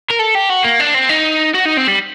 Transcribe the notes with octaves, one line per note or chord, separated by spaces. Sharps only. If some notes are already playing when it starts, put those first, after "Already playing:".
A#4
A4
G4
F#4
A#3
D4
C4
D#4
F#4
D#4
C4
G3